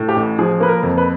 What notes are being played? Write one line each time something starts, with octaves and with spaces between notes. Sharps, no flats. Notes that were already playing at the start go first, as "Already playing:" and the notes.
Already playing: A2
G4
A1
F3 G#4
A#3 B4
A#4
F2
B4